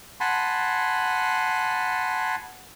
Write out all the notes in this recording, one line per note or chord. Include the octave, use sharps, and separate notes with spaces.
F#5 G#5 A5 B5 C6